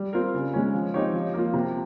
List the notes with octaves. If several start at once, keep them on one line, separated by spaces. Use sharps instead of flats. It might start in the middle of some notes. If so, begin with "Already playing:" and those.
Already playing: G3
C4 F4 A#4
C#3
G#3 C#4
F3
C4 D#4 G4 C#5
F3
A#3 F4
C3